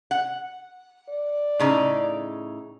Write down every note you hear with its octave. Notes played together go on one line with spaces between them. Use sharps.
F#5
D5
A2 C#3 D#4